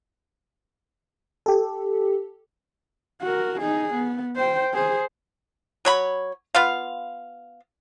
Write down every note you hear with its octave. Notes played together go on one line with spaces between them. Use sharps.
G4 A4
F#4 A#4
D#4 G#4
B3
C5 G5
G#4 C5
F#3 C#5 B5
B3 F4 F5